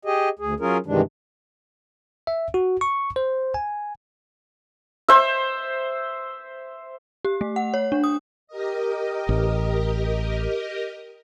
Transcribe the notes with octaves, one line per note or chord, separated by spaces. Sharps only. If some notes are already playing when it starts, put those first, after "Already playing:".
G4 G#4 D#5
D2 G#4
F#3 C#4 F4 G#4 A#4
G2 C3 D#3 E3 G#3 D4
E5
F#4
C#6
C5
G#5
C5 E5
G4
A3
F#5
C#5
D4
D#6
G4 A#4 D#5
A1